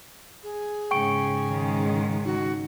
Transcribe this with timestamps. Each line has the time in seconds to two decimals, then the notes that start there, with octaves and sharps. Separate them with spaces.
0.43 G#4
0.91 G#2 C#3 G5 C#6 D7
1.49 D#3 G#3
2.25 D#4 F#4